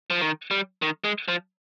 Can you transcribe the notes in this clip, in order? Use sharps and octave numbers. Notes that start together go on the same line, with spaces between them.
F3
D#3
G3
D#3
G#3
F3